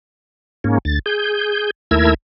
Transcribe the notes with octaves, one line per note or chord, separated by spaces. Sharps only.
G#2 A#3 C#4
D2 A6
G#4 G6
D#2 A3 E4 A#4 E6 G#6